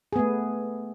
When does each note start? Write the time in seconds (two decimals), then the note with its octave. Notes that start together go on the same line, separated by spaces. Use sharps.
0.13 G#4
0.16 B3
0.19 A3